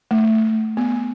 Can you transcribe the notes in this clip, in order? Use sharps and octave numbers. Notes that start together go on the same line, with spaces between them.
A3
B3